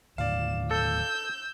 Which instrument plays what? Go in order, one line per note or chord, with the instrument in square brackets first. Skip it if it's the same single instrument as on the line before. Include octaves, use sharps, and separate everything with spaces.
[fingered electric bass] D#2 A2 D3 [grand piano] D5 F5 [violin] E7
[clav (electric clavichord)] A4 [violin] E6 G6